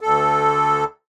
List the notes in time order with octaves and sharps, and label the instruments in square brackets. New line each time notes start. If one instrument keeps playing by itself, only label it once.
[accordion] D2 A4